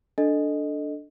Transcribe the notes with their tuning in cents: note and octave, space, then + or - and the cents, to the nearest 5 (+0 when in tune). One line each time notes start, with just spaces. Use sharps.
D4 +0 A4 +0 D#5 -10